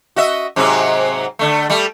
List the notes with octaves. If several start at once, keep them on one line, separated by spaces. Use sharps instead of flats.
F#4 D#5 E5
G#2 C3 F#3
D3 A3
G3 A3